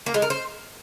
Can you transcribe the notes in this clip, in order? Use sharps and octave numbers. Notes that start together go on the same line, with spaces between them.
A#3
G#3
A#4
C5